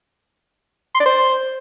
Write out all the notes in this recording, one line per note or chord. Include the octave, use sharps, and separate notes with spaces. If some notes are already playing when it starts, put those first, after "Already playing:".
C6
D5
C5